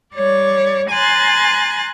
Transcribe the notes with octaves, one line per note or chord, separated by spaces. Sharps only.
G3 C#5 D5
G#5 A#5 C6 F#6 A6